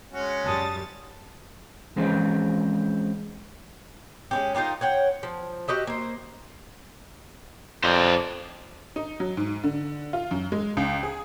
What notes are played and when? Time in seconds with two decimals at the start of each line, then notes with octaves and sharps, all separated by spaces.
0.12 G#3 C#4 F#4
0.45 F#2 G3 A5 D#6 A6
1.96 E3 F3 G#3 C4 C#4 C5
4.31 G#3 C#4 G4
4.55 D#4 F4 G4 A#4
4.81 C#5 F#5 G5
5.23 F3
5.68 F#4 G4 D#5 E5
5.87 A#3 C5
7.83 F2 C5 D5
8.96 D#4
9.20 F#3
9.37 G#2
9.64 D3
10.13 F4
10.31 F#2
10.52 G#3
10.77 C#2
11.03 G#4